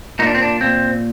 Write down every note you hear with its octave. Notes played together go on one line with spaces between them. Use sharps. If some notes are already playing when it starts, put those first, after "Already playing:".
A#2 D#4
D4
C4
D4
A#2 C4